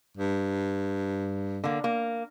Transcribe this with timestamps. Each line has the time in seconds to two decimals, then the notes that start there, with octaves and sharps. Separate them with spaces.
0.17 G2
1.64 D3 A#3
1.84 A#3